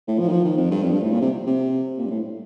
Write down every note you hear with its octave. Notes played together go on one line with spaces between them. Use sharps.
A2
F3
D#3
F3
D#3
F2
G2
F2
G2
A2
A#2
C3
C3
A#2
G2
A2